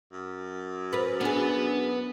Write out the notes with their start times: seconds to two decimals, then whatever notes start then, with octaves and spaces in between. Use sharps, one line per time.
0.13 F#2
0.93 A#4 B4
1.21 B3 D4 G#4